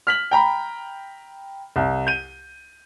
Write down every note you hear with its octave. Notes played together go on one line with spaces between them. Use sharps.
F6 B6 F#7
G5 A#5 B5
C2
G6 D#7